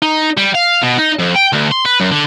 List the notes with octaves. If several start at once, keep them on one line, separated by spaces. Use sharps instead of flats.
D#4
G3
F5
B2
D#4
F2
G5
D2
C6
B4
F#2
D3